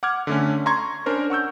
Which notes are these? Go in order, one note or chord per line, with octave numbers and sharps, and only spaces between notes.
F#5 D6 F6 G#6
D3 A3 C#4
A#5 C6 C#6 G#6
C#4 D4 A#4 C5
F#5 C#6 E6 G6